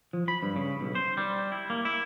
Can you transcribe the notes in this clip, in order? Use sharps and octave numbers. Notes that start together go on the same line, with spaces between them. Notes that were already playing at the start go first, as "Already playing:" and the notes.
F3
B5
G2
C#3
B1
C5
G3
E4
A#3
E4